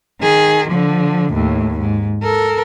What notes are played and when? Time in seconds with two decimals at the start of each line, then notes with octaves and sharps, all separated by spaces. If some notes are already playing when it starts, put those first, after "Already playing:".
0.20 D#3 G#4
0.68 D3 F3
1.33 D#2 A2
1.80 G#2
2.22 A4 A#4